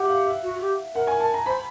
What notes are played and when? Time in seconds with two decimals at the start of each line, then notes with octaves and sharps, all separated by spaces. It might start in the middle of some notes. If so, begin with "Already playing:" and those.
Already playing: G4 E5 F#5
0.09 F5
0.26 E5
0.43 F#4
0.61 G4
0.95 A#4 F#5
1.07 G#5
1.20 A5
1.34 A#5
1.46 C5 B5